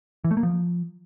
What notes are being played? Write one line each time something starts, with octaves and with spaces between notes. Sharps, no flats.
E3
A3
A#3
F3